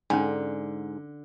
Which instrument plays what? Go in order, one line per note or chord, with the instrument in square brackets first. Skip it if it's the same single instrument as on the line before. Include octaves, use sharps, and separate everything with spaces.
[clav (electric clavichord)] G#2 [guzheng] D3 [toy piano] C#4 G#5